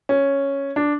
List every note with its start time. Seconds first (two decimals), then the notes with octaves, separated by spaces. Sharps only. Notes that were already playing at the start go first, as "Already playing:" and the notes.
0.09 C#4
0.76 D4